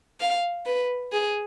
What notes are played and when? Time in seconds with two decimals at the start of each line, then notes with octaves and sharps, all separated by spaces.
0.20 F5
0.66 B4
1.12 G#4